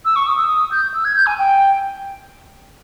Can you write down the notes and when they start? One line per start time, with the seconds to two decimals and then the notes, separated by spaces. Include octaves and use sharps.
0.05 E6
0.16 C#6
0.27 D#6
0.38 E6
0.49 D#6
0.71 G6
0.94 E6
1.05 G#6
1.16 G6
1.26 G#5
1.39 G5